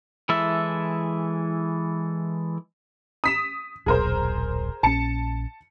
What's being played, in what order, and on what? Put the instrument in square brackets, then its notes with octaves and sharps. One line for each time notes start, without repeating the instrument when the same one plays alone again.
[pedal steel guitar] E3 G#3 E4 A4 E5
[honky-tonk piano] D#6 B6 E7
[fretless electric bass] D#1 B1 [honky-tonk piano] G#4 A#4 C5
[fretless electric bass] A#1 C#4 [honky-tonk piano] A5 C#7